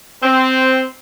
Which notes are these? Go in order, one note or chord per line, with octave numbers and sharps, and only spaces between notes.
C4